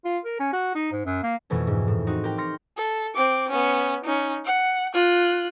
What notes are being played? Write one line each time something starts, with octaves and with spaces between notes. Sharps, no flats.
F4
A#4
C#4
F#4
D#4
G#2
F#2
A#3
F2 B2 E3 A3 C#4
G#2
A2
C4 D#4 F#4
G4 A#4 G5
C6 F6 A#6 C#7
A4
C4 D6
B3 C#4
C#4 D#4
F#5
F4 F#6